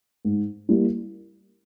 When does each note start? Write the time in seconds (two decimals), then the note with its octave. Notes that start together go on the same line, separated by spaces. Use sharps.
0.25 G#2
0.69 G3 A#3 E4